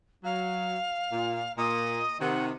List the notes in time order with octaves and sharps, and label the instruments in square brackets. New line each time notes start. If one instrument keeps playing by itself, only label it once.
[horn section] F#3 [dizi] F5
[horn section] A#2
[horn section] A#2 [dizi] D#5
[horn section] C3 D#3 [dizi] F#5